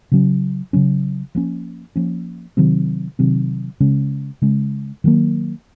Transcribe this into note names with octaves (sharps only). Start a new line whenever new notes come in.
C#3 F#3 C#4
C#3 F#3 C#4
F3 A#3 C#4
F3 A#3 C#4
C3 D#3 F#3 C4
C3 D#3 F#3 C4
C#3 G#3 C#4
C#3 G#3 C#4
D#3 F#3 A#3